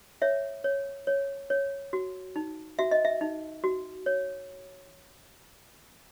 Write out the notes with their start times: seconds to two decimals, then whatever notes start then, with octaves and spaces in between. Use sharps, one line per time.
0.22 C#5 E5
0.64 C#5
1.07 C#5
1.50 C#5
1.93 F#4
2.36 D#4
2.79 F#4 E5
2.91 D#5
3.05 E5
3.21 D#4
3.64 F#4
4.06 C#5